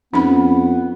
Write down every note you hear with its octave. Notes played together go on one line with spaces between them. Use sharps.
F2 B3 C#4 D#4 B5